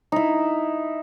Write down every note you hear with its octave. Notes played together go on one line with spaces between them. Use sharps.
D#4 E4